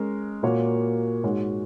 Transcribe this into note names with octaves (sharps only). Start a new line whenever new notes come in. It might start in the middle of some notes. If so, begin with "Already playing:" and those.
Already playing: G#3 C#4 A#4
A#2 A#3 F#4 A#4 C#5
G#2 G#3 F#4 C#5